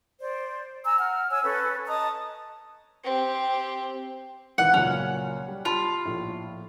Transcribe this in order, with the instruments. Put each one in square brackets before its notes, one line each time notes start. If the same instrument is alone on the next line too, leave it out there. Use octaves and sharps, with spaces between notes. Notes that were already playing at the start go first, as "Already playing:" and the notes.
[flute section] C5 D5
G#5 A#5 E6
F#5 F6
C#5 G#5 E6
C#4 A4 B4
D#5 A5 A#5 D#6
[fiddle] C4 G4
[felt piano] G#1 E3 [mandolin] F#5
[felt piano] C#2 A#2 F#3 [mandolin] C#4
[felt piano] G3
[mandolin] F4 [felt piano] G4 A5 B5
[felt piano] A#1 A2